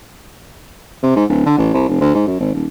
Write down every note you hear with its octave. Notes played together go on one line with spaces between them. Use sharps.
C3
G#2
D1
D3
A1
C2
F1
D2
G#2
F#2
G#1
D#1